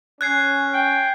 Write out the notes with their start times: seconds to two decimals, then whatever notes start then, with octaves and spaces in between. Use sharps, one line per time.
0.21 C#4 F#6 G#6 C7
0.74 G5